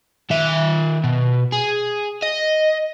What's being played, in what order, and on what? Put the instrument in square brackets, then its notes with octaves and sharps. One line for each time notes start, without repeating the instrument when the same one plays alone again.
[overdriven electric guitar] D#3 E5
B2
G#4
D#5